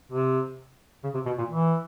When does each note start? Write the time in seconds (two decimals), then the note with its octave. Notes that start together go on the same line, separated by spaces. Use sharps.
0.12 C3
1.03 C#3
1.14 C3
1.26 B2
1.38 A#2
1.49 E3